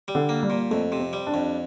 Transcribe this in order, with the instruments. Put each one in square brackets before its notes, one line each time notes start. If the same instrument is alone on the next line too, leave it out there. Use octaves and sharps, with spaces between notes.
[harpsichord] G3
[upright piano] D3
[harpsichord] A#3
[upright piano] G3
[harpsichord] A#2
[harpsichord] F2 [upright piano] A3
[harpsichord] C3
[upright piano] C4
[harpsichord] G3
[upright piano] D4
[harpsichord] F2